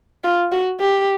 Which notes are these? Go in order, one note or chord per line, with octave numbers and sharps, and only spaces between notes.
F4
F#4
G4